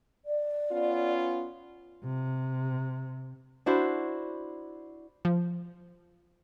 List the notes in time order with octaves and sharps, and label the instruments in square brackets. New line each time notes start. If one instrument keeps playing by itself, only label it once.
[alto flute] D5
[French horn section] B3 C#4 F4
[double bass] C3
[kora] D4 E4 F#4 C5
[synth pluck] F3